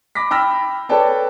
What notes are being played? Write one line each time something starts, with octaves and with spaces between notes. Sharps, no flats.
B5 D6 A#6 B6
G5 B5 E6 F6 A#6
A4 B4 C#5 D5 G5 A5